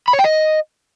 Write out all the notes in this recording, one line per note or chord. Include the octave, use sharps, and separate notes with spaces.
B5
C#5
G5
D#5